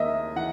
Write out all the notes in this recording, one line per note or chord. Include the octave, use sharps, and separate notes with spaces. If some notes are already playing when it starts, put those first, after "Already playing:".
Already playing: D#2 A#3 D#5 E5
E3 F#5